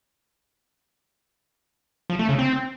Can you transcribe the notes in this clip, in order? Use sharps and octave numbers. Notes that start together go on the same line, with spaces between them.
F3
A3
C#3
C4